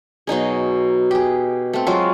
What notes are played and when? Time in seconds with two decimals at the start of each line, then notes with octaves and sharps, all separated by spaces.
0.27 B2 F#3 D#4 G#4
1.11 G4 G#4
1.73 A3 C4
1.86 F#3 G#3 F4 F#4